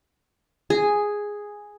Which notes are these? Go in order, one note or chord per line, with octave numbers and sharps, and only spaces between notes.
G#4